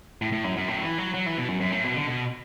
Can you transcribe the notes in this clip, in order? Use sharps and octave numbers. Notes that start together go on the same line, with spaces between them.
A2
A2
F#2
F#2
A2
F#3
E3
F#3
F#3
E3
B2
F#2
F#2
A2
B2
D3
B2